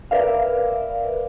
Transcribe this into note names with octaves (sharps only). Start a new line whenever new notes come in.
A#4 B4 D5 E5 F5